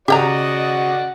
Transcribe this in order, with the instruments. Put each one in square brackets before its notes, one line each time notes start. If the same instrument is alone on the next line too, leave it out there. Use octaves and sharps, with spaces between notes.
[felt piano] C#3 [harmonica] F#4 D5 F#5 [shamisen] G4 G5 A#5 [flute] D#5